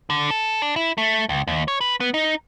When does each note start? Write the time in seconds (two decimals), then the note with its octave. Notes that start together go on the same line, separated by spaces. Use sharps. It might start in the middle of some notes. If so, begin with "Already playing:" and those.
0.10 D3
0.31 A4
0.62 D4
0.76 E4
0.98 A3
1.29 C#2
1.48 D#2
1.68 C#5
1.81 B4
2.00 B3
2.14 D#4